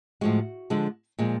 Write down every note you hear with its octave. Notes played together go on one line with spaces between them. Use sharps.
A2 F3 G#3 F#4
D3 F3 G#3
A#2 F3 G#3